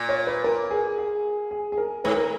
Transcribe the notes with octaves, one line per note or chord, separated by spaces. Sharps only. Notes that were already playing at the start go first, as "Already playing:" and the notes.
Already playing: A#2
C#5
B4
A#4
G#4
G#4
G#4
G#4
A#4
G#2 B4
A#4